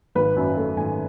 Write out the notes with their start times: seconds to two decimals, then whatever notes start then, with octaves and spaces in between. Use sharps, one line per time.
0.15 G#1 B4
0.36 F#2
0.57 A3
0.76 G#1 G#5